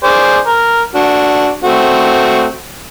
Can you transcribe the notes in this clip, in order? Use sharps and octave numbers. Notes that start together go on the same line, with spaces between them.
G#4 C5 D5
A#4
D4 F#4
A3 C4 F#4